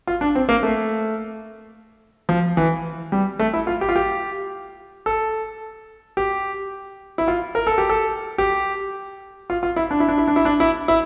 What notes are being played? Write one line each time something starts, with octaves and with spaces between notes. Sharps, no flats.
F4
D4
C4
A#3
A3
F3
E3
G3
A3
E4
F4
G4
F4
G4
A4
G4
E4
F4
A#4
A4
G4
A4
G4
F4
F4
E4
D4
E4
D4
E4
D4
E4
D4
E4
E4